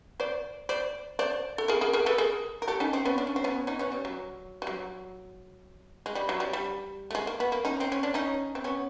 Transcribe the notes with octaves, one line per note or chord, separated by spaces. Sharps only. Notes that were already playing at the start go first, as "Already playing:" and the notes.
C5 D5
C5 D5
C5 D5
A4
G#4 A#4
G#4 A#4
G#4 A#4
A4 B4
G#4 A#4
A#4
G4 A4
C#4 D#4
C4
B3 C#4
D4
C#4
C4
B3 C#4
C#4 D#4
B3 C#4
G3
F#3
G3
F#3
G#3
G3
F#3
G3
G3
A3
G#3
A#3
B3
A#3
C#4 D#4
C4
C#4
D4
C#4 D#4
C4
B3 C#4